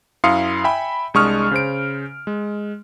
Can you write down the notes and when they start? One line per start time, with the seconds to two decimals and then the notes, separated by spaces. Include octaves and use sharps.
0.24 F#2 E4 F5 C6 D#6 C#7
0.64 E5 G5 G#5 B5
1.14 C2 G#3 D4 C#6 D#6 F6
1.51 C#3 C5 D7
2.27 G#3